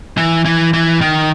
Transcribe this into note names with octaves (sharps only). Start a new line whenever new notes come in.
E3
E3
E3
D#3